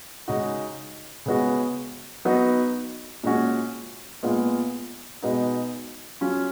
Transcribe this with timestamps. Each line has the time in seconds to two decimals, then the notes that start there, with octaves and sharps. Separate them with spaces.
0.28 C#3 G#3 D#4 F#4
1.26 C#3 G#3 B3 F#4
2.25 F#3 B3 D#4 F#4
3.24 A#2 G#3 C#4 F#4
4.23 A#2 G#3 B3 F4
5.22 B2 G#3 B3 D#4
6.21 F#3 C#4 F4